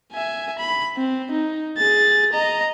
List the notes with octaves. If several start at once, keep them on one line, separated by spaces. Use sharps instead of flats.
E5 G#5
B5
C4
D#4
G#4 A6
D#5 A#5